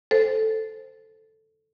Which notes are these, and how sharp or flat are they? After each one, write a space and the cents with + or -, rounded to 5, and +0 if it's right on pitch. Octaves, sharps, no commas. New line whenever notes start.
A4 +0 C5 +0